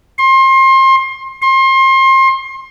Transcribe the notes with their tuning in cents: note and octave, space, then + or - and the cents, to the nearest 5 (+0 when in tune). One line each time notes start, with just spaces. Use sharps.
C6 +30
C6 +30